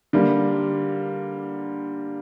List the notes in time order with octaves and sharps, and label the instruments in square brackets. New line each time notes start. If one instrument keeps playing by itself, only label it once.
[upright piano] D3 G3 A#3